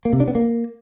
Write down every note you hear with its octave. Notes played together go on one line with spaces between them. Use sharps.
A#3
C3
D4
B3
A#3